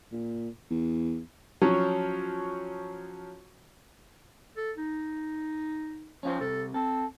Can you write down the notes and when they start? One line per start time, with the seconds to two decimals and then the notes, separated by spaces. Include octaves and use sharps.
0.12 A#2
0.70 E2
1.62 F3 F#3 C#4
4.57 A4
4.78 D#4
6.23 F3 C#4 F4 C5
6.40 C2 C3 A4
6.74 C4 A4